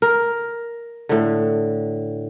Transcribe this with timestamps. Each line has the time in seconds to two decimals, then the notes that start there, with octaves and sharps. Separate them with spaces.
0.02 A#4
1.09 A2 D3